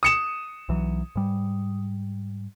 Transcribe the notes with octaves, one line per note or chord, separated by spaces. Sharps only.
D#6 C#7 E7
B1 E3 F#3
G#2 G3